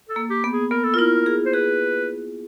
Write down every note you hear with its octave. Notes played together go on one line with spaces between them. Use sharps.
A4
A#3
G4
B3
G#4
B3 A#4
A4
F4
E4 A#4
G#4
C5
G#4 B4